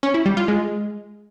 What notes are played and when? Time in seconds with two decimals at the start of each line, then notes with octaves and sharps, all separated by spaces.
0.03 C#4
0.14 E4
0.26 G3
0.37 F4
0.48 G#3